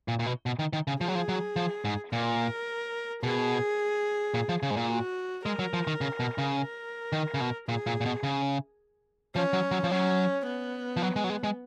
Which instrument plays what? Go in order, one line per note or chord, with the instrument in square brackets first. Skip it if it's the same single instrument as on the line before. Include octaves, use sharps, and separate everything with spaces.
[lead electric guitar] A#2
A#2
B2
B2
D#3
D#3
C#3
[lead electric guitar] F3 [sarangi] G#4
[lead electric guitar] F#3
F3
F#3
F3
G#2
[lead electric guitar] A#2 [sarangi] A#4
[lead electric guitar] B2 [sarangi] G#4
[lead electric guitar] A#2
F3
C#3
G#2
A#2
[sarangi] F#4
[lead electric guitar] G#3 [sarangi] A#4
[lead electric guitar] F#3
F3
D#3
C#3
B2
C#3
[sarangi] A#4
[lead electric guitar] D#3
C#3
B2
[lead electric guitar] A#2 [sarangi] G#4
[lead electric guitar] A#2
A#2
B2
C#3
[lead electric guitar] F3 [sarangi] C#4
[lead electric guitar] F#3
F#3
F3
[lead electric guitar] F#3 [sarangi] C#4
[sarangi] B3
[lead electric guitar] F3
F#3
G#3
F#3
G#3
G#3